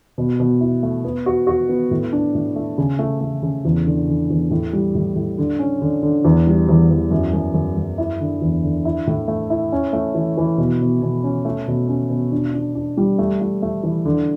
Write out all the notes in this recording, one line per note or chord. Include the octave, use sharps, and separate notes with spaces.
B2
B2
E4
A3
B3
F#4
F#4
B3
A2
D4
A2
A3
C#3
A3
A3
C#3
E2
D3
D3
E2
A2
G3
A2
A2
D3
C#4
D3
D3
E2
G3
E2
E2
F#2
F#2
F#2
F#2
E4
D3
E2
D3
E4
A2
A3
E4
C#4
A3
E3
E3
B2
B2
B2
C#4
A3
B2
C#4
B2
D4
D4
D4
G3
A3
A3
A3
E3
D3